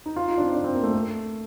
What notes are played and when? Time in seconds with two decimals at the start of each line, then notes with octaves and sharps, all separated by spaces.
0.06 D#4
0.16 F4
0.28 D#4
0.38 D4
0.42 C4
0.54 D4
0.64 C4
0.75 A#3
0.83 A3
0.94 A3